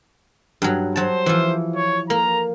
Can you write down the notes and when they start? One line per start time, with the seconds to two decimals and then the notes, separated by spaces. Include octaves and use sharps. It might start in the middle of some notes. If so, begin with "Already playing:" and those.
0.62 G2 F#3
0.96 F#3 C5 A5
1.26 E3 F3
1.76 C#5
2.10 A#3 A#5